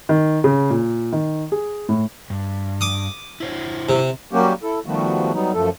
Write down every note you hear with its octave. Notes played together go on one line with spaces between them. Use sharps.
D#3
C#3
A#2
D#3
G#4
A2
G2
D6 D#6
E4 C5 C#5
C3
F#3 G3 A#3 C#4 F#4 G4
E4 A4
D#3 F3 G3 A3 B3 F#4
F#3 G3 B3 D#4
F#2 F3 A3 A4